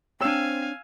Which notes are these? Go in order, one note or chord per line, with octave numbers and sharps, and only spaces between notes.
C4 D4 C#5 F5 G5 G#5 E6 E7